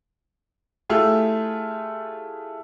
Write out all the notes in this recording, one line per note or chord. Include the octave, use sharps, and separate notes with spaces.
A3 E4 F4 G4 G#4